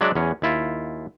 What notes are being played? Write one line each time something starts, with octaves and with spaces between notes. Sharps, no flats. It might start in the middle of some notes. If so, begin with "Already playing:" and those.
F#3 G#3 D4 F#4 D5 E5
E2 C#4 G#4
D#2 E4 F4